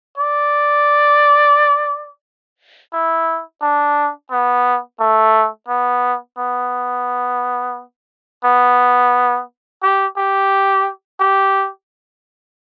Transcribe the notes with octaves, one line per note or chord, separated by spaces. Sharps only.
D5
E4
D4
B3
A3
B3
B3
B3
G4
G4
G4